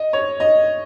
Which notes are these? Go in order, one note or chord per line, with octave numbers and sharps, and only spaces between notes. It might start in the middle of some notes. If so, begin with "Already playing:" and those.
Already playing: D#5
C#5
D#5